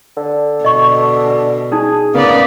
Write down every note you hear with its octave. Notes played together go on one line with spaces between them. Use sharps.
D3
B2 D#5 C#6
D4
C#4 D#4 G#4
C#3 A#3 B3 B4 D5